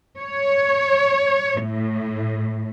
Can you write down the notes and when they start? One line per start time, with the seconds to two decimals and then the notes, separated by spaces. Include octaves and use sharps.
0.20 C#5
1.62 A2